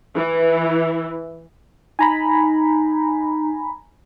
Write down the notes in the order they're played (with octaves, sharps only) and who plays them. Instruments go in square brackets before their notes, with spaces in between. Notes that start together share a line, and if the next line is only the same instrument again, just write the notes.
[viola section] E3
[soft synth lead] D#4 [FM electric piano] G#5 A#5 B5